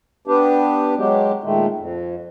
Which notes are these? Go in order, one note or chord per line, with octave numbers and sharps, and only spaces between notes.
B3 D4 G4
F#3 G#3 G4
A#2 D#3 G#3 A3
F2